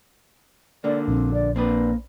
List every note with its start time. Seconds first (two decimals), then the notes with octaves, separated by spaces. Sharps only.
0.84 D3 A#3 D5
1.08 A#1 C4
1.34 D5
1.56 A#3 C4 D4 B4